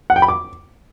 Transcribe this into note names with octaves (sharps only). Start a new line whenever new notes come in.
F#5
G5
B5
D6